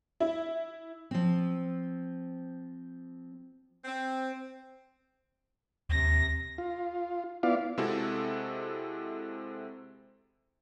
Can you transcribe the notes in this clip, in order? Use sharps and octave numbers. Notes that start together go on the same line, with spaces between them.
E4
F3 C4
C4
D#2 C3 A#6
F4
B3 E4 F4 D5 F5
C3 G#3 C4 E4 F#4 A4